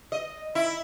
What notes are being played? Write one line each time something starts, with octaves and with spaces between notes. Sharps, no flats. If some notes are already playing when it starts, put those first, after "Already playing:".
D#5
E4